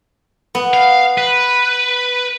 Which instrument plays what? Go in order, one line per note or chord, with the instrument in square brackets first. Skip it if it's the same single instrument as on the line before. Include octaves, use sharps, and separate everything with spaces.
[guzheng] B3
[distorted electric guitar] F5
B4